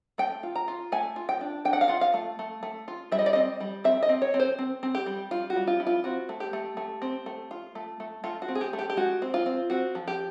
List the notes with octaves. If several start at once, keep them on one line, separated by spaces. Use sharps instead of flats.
A3 G5
F4
A#5
F4
A3 G#5
F4
G5
D4
D4 G5
F#5
F5
F4 F#5
F5
A3
A3
A3
F4
G3 E5
D#5
D5
C4 D#5
G3
C4 E5
D#5
C4
C#5
C4
C5
C4
C4
G4
G3
G3 F4
F#4
G3
F4
E4
F4
C4 F#4
A3
G4
A3
A3
C4
A3
F4
A3
A3
A3 F4
F#4
C4
G#4
G4
A3
G4
G4
G#3 F#4
C4
F4
C4
C4 F#4
F3
G4